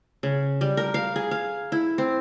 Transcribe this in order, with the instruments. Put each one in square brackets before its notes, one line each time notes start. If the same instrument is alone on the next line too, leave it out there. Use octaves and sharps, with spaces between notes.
[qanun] C#3
G3
A#4
F5
G#4
F5
E4
C4